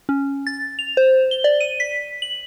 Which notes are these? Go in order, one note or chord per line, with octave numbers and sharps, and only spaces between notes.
C#4
A6
F7
C5
G7
D5
D#7
B6
F#7